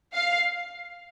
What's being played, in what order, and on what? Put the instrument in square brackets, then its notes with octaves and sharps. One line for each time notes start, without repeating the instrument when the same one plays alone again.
[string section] F5